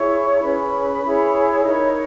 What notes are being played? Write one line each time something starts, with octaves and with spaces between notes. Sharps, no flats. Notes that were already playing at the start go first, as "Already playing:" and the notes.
Already playing: E4 G#4 C#5 C#6
A#5
C#4 G#4 B4 B5
E4 G#4 C#5
D#4 A#4 C#5 B5